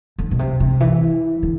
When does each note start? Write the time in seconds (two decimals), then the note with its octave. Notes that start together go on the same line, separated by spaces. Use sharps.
0.19 D3
0.31 B2
0.39 C3
0.60 C3
0.80 E3
1.43 D3